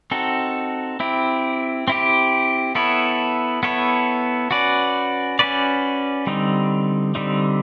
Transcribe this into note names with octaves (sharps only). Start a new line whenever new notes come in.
C4 D#4 F#4 A4
C4 E4 G4
C4 E4 G4
B3 E4 A4 C#5
B3 E4 A4 C#5
C#4 F#4 B4 D5
C#4 F#4 B4 D5
D3 G3 C4 D#4
D3 G3 C4 D#4